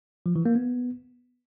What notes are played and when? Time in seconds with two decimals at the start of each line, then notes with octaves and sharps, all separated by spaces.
0.26 F3
0.36 E3
0.46 A#3
0.55 B3